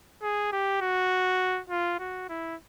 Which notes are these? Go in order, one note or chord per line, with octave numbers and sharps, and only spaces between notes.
G#4
G4
F#4
F4
F#4
E4